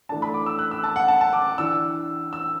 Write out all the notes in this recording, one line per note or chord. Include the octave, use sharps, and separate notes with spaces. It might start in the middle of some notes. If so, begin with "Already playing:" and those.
E3 A3 D4 A5
B5
D6
E6
F#6
E6
A5
F#5
A5
A5
D6
E3 D4 E6
E6